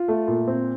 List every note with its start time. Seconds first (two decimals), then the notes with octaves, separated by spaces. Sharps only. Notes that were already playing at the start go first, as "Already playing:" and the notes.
Already playing: F4
0.08 A3
0.28 A#2
0.48 C4